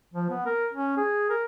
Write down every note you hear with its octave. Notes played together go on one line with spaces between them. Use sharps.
F3
B3
A#4
C#4
G#4
A#4